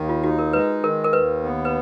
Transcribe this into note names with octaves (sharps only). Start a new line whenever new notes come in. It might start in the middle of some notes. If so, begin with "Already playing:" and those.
Already playing: D#2 D#3
F4
D#4 F#4
A#4
G#3 B4
D#3 A#4
A#4
D#2 B4
B3
B4